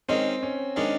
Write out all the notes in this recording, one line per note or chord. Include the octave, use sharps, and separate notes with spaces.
D#3 G#3 C4 C#4
C#4
D#3 G#3 C#4 D4